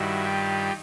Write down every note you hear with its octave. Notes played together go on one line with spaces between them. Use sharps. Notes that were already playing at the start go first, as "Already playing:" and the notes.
Already playing: G2 D#3 G3 E4 F#4
F4 G4